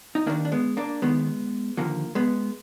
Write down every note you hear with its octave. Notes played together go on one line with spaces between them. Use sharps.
D#4
D#2 D#3 A#3 D4
D4
G#3 B3
A#3 D4
D#2 D#3 G#3 B3
D#2 D3 F3 F#3 A#3
G#3 B3